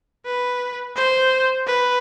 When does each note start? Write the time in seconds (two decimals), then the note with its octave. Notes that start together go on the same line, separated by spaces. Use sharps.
0.25 B4
0.96 C5
1.66 B4